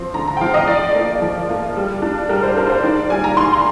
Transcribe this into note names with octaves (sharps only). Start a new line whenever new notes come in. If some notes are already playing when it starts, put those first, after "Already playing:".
Already playing: F3 C4 C6
D3 A#5
A#5
G5
F3 C4 F5
D#5
F3 D5
A#3 F4
F3
A#3 F4
G3
D4 F4
G3 A#4
C5
D4 F4 A#4
C5
D#3 D5
G3 A#3 F4 G#5
A#5
D#3 C6